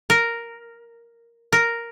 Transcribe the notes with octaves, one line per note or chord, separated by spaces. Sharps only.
A#4
A#4